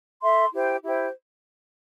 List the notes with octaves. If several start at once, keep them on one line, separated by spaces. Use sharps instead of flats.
A4 E5 C6
E4 G4 C5 G5
E4 G4 C5 G5